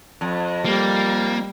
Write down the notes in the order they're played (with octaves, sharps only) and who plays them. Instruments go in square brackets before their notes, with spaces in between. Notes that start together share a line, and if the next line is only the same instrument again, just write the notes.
[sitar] F2
[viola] G3 [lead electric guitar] A#3